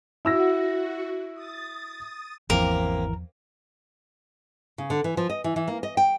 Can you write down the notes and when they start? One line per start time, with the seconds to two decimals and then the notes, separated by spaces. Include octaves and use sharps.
0.25 E4 F#4 E6 A#6
1.34 D#6 A6
2.50 G#1 E2 C3 E3 F3 A#3 A#4
4.78 C#3
4.90 D3
5.04 E3
5.17 F3
5.30 D#5
5.44 E3
5.56 E3
5.68 A#3
5.83 D#5
5.97 G5